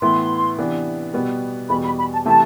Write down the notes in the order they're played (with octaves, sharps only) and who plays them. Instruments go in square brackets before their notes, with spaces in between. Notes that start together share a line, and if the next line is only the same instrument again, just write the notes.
[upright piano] A2 E3 B3 E4 [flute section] C6
[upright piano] C3 E3 B3 D4
B2 G3 B3
[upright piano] E2 B2 G3 [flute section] B5
[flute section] B5
B5
A5
[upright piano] C3 E3 A3 C4 E4 [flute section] A5